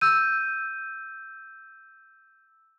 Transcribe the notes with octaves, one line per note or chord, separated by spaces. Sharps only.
E6 G6 D#7